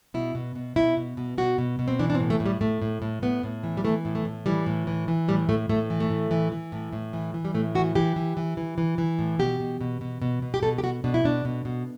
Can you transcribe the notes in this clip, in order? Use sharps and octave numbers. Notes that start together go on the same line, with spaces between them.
B2 E4
B2
B2
B2 E4
B2
B2
B2 F#4
B2
B2
C4
E3 D4
D4
C4
A2
A3
A2
G3
A2 A3
A2
A2
A2 B3
A2
E3
G3
E3 A3
A2
A3
A2
E3 G3
A2
E3
E3
A2 G3
A2 A3
A2 A3
E3
A3
A2
E3
E3
A2
A2
E3
E3
G3
A2 A3
E3 F#4
E3 G4
E3
E3
E3
E3
E3
A2
B2 G4
B2
B2
B2
B2
B2
G4
B2 A4
G4
B2 F#4
B2 D4
E4
B2 D4
B2
B2